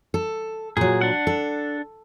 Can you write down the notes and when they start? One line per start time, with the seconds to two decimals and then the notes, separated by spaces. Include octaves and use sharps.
0.14 A4
0.77 A#2 F#3 G#4
1.01 D4 F#5
1.27 A4